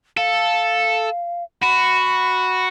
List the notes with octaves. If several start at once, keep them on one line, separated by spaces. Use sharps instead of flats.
A4 F5
F#4 B5